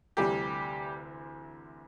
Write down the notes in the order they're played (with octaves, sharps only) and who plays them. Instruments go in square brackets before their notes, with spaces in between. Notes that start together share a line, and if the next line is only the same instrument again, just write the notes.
[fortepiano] D2 C3 E3 G3 G4